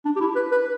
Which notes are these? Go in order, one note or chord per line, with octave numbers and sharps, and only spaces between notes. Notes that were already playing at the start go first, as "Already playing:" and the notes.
D4
G4
E4
B4
B4